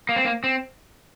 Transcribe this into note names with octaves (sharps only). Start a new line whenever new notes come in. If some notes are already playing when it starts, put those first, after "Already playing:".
A#3
C4
A#3
C4